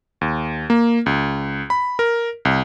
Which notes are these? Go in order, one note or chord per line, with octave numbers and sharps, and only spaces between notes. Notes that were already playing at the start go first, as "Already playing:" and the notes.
D#2
A#3
C#2
B5
A#4
C2